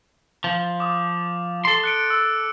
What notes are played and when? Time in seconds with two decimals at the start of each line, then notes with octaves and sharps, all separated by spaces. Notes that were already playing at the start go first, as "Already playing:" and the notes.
0.44 F3
0.80 D6 D#6
1.65 A4 C6
1.84 F#6 C#7 D7
2.10 E6